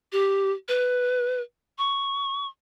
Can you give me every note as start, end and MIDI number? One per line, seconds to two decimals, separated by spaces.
0.12 0.52 67
0.68 1.41 71
1.78 2.47 85